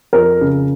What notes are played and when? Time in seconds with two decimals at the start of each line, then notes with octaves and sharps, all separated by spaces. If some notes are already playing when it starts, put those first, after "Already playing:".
0.13 F2 A#4
0.41 C#3